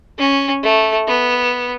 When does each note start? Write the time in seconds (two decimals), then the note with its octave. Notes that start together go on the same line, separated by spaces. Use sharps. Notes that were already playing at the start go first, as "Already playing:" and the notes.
0.18 C#4
0.63 A3
1.08 B3